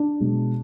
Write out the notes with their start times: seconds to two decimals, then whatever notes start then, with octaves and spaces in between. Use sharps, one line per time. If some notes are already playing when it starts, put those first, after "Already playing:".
Already playing: D4
0.20 B2 G#3